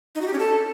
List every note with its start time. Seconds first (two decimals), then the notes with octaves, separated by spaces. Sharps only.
0.15 D#4
0.21 F#4
0.27 G4
0.33 C#4
0.39 A4